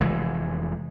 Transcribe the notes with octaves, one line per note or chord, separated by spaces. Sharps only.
F1 E3 G#3